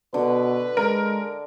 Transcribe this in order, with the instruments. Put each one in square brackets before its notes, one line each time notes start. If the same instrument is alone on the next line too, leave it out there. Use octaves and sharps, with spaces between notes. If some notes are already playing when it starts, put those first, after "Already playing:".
[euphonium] B2 [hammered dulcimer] D3 [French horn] B4
[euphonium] G#3 [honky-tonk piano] A#4